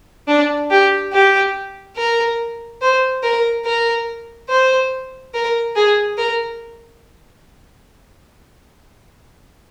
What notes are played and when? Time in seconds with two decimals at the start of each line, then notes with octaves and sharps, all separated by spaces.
0.27 D4
0.71 G4
1.12 G4
1.96 A#4
2.81 C5
3.23 A#4
3.65 A#4
4.49 C5
5.34 A#4
5.76 G#4
6.18 A#4